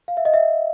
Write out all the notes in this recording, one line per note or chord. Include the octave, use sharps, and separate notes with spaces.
F5
E5
D#5
E5